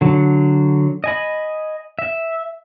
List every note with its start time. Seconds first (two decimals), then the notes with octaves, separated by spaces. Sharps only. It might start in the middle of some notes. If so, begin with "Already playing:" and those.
0.01 D3 F#3
1.04 D#5 G#5 B5
1.99 E5